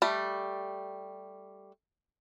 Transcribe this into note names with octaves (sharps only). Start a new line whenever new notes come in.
G3 A3